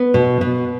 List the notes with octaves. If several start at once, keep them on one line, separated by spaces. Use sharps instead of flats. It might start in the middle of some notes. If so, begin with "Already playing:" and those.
Already playing: B3
B2
B2